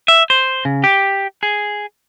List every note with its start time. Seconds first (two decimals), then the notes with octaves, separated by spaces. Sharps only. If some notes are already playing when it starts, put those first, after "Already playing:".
0.08 E5
0.30 C5
0.65 C#3
0.84 G4
1.43 G#4